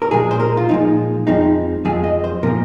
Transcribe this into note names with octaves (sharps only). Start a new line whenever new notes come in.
A#4
A#2 F3 G#3 G#4
C5
A#4
F4
A#2 F3 G#3 D#4
F2 F3 G#3 C4 D#4
F2 F3 G#3 C4 G#4
D#5
C5
A#2 F3 A#3 A#4